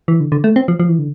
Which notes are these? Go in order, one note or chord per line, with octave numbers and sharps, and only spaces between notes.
E3
D3
D3
A3
C4
F3
F3
E3
D3